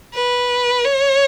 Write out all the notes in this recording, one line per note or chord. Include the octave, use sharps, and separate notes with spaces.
B4
C#5